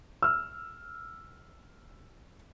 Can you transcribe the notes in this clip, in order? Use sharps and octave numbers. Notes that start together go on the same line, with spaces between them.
E6 F6